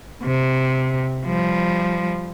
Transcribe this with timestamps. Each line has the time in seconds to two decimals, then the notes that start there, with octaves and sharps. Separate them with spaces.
0.23 C3
1.25 F3 G3